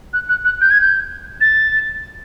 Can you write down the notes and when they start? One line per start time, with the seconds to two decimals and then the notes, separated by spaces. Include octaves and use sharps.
0.13 F#6
0.29 F#6
0.45 F#6
0.61 G6
0.71 G#6
0.81 G6
1.41 A6